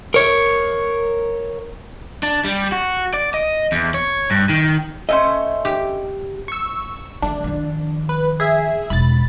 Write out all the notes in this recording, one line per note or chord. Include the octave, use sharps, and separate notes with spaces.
A#4 C#5
D4
G3
F#4
D5
D#5
E2
C#5
G2
D#3
A3 C#4 C5 D#5
G4
C#6 E6
E3 A3 D4
D#3 F3
B4
G#4 E5
E1 D#4 B5 A6